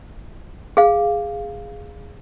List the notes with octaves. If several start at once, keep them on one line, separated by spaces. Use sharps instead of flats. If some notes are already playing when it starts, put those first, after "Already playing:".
G#4 F5